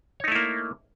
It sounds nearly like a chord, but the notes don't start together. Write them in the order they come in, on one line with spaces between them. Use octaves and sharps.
C#5 D#4 A3 E4 A#3